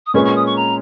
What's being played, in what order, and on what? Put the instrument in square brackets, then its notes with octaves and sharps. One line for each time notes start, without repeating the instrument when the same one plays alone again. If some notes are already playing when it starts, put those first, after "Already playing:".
[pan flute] D#6
[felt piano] A#2 G#3 C#4 G#4 B4 [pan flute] C#6
[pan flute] C#6
D#6
C#6
A#5